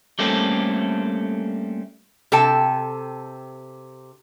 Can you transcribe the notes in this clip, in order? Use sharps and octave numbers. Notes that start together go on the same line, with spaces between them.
G3 A3 A#3 C4 C#4 A4
C3 A4 G5 A5